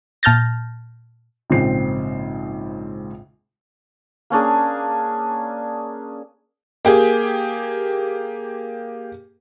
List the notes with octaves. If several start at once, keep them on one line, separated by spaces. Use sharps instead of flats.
A#2 A5 F6 G6 A6 A#6
A#1 G#2 C#3 C4 C7
A#3 C#4 D4 G#4
A#3 G4 G#4